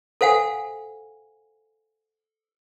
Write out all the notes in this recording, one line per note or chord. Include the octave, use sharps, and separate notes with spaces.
A4 C5 F5 F#5 G#5